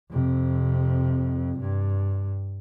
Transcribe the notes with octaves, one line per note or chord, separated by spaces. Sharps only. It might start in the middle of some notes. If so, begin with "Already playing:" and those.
F2 C3
G2